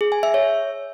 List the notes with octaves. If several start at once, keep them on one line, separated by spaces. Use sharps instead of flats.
G#4
G#5
E5
C#5